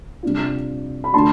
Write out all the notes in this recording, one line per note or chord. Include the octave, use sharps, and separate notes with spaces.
C3 G3 D4 F4
B5
D3 A3 D4 F4 A5 C6